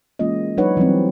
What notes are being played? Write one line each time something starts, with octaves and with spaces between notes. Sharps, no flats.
E3 G#3 A#3 C#4 F4 D#5
F#3 D4 D#4 B4 C#5 F#5
E3 F#3 G3 C4